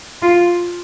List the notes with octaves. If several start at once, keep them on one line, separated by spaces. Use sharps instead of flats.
F4